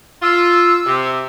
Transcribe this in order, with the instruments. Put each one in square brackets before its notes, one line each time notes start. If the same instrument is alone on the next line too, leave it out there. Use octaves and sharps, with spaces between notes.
[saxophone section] F4 [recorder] E6
[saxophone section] C3